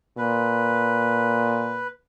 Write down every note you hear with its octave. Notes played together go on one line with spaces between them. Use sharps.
A#2 B4